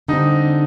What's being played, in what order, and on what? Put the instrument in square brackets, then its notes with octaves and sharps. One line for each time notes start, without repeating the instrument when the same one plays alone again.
[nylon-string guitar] D3 G3 C4 [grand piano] D#4